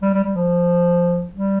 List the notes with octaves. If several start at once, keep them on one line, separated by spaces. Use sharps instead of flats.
G3
G3
G3
F3
G3